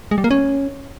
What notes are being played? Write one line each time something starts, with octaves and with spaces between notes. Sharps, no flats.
G#3
G3
A#3
C#4